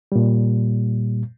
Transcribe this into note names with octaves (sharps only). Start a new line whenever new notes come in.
A#2 G3